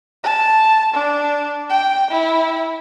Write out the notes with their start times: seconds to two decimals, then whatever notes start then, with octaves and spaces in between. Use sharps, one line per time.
0.24 A5
0.94 D4
1.70 G5
2.10 E4